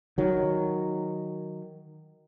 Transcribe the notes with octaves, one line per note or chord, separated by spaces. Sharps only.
D#3 F#3